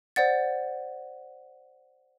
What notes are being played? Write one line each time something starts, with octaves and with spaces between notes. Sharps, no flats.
C5 D5 F#5 A6